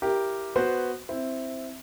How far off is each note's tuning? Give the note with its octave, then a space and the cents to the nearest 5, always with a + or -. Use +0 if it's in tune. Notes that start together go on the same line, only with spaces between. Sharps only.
E4 +10 G4 +0 A#4 +0
B3 +0 F#4 +0 C5 +0
C4 +0 E4 +0